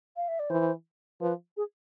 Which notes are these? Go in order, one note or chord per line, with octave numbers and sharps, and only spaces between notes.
F5
E5
D5
E3 C5
F3 B4
G#4